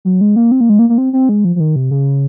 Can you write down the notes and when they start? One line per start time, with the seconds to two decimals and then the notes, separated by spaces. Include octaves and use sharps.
0.05 F#3
0.21 G#3
0.36 A#3
0.52 C4
0.61 A#3
0.69 G#3
0.79 A#3
0.89 A#3
0.98 C4
1.13 C4
1.29 G#3
1.45 F3
1.56 F3
1.60 D#3
1.76 C3
1.91 C#3